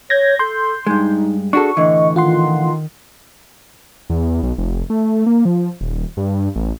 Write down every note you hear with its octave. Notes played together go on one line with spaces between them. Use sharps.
C#5 G6 G#6 A#6
A4 C6 G6
G2 G#3 D#4
D4 F#4 G#4 A4 C#6
A2 D3 E3 D#5
D#3 F4 F#5 C6
E2
B1
F1
A3
A#3
F3
D#1
G2
A1